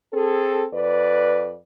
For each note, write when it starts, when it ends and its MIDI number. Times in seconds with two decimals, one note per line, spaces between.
0.13 0.64 60
0.13 0.64 68
0.13 0.64 69
0.73 1.56 41
0.73 1.56 71
0.73 1.56 74